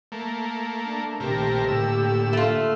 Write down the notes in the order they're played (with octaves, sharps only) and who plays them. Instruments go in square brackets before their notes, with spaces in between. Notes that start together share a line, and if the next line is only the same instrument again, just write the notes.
[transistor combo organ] A3 A#3
[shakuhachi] D4
[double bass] A#1 D#3 [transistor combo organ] C3 A3 A#4 [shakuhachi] G4
[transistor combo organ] A2 E6 [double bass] D3 A#3
[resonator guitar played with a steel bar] A3 F4